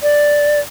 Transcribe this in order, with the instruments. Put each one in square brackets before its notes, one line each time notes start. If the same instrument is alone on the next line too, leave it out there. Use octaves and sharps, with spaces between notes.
[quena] D5